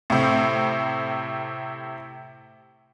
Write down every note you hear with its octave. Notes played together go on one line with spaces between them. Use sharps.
A2 C3